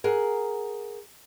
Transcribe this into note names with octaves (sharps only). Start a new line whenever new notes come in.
G#4 A#4 F#5